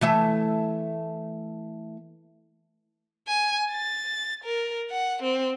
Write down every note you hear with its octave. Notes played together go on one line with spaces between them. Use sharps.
E3 A3 E5
G#5
A6
A#4
F#5
C4